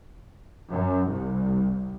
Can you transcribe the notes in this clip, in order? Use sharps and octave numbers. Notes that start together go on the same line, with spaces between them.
F#2
C2